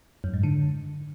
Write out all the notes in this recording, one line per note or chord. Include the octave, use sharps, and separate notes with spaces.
F#2
G#2
D3